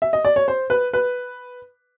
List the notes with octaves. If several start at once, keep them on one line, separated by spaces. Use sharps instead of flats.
E5
D#5
D5
C#5
C5
B4
B4